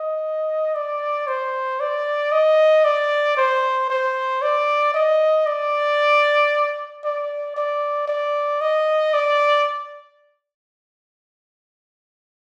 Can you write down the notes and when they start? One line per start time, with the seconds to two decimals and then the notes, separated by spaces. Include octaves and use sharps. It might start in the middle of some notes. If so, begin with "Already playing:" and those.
Already playing: D#5
0.75 D5
1.27 C5
1.80 D5
2.32 D#5
2.85 D5
3.37 C5
3.90 C5
4.42 D5
4.94 D#5
5.46 D5
7.04 D5
7.56 D5
8.08 D5
8.61 D#5
9.14 D5